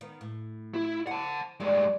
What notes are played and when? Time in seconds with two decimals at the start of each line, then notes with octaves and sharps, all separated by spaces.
0.01 D#3 B3
0.21 A2
0.74 E4
1.07 C5 F#5 A5
1.60 G2 G#3 D5